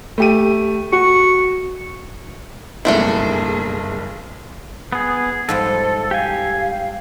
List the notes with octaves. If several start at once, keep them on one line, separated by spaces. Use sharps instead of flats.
A3 G4 D#7
F#4 C#6
F#1 B1 G2 A3 A#3 D4 E4 G#4
B3 G#4
G#2 F3 G3 A4
G4 F5 G#5